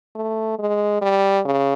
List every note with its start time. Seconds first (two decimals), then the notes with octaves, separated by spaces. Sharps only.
0.16 A3
0.59 G#3
1.01 G3
1.45 C#3